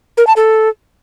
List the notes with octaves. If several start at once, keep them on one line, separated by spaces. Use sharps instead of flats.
A#4
A5
A4